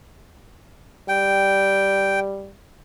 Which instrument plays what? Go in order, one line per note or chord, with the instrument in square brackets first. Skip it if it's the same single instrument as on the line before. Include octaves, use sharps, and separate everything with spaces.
[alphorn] G3 [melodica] G5